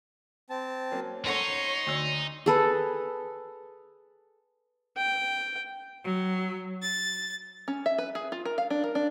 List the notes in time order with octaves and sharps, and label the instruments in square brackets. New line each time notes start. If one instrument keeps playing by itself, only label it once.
[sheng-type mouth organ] C4 A5
[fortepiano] F#3 A#3 C#4
[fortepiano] C#4 A4 F#5 [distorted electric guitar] D#4 [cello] C#5 [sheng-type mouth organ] C6
[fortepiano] D2 E6
[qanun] G#4 A4 B4
[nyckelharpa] G5
[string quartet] F#3
A6
[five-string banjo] C#4
E5
B4
G#4
F4
A#4
F5
D4
A#4
D4